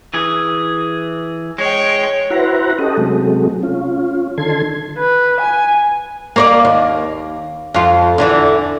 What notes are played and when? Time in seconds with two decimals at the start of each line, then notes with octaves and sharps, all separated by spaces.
0.14 E3 G#4
1.58 G#3 C#5 G5
2.30 E4 F#4 B4 C5 F#5 A#5
2.79 C#4 G4 A4 D#5
2.97 C3 F#3 G#3 A3
3.63 C#4 F4
4.38 D3 D#3 A4 C6 G#6
4.99 B4
5.41 G#5
6.36 A#3 C#5 D5
6.65 D#2
7.74 F2 F4
8.18 E2 D3 E3